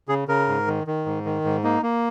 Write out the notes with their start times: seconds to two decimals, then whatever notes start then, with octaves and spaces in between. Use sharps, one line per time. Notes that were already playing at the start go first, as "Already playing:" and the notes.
0.09 C#3 G#4
0.28 C#3 A#4
0.48 G#2
0.67 D#3
0.87 D#3
1.06 G#2
1.25 D#3
1.45 G#2
1.64 A#3 D#4
1.83 A#3